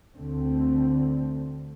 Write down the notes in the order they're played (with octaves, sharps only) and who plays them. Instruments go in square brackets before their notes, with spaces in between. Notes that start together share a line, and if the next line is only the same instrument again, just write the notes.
[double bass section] D2 D3 A3 C4